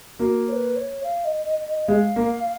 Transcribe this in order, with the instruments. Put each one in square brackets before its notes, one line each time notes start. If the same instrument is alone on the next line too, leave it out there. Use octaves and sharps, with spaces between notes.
[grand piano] A#3 [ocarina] F#4
[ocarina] C#5
B4
C#5
F5
D#5
D#5
D#5
[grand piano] G#3 [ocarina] F5
[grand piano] A#3